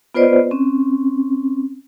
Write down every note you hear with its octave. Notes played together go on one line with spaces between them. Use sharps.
B3 F4 B4 C5 D5 D#5
C4 C#4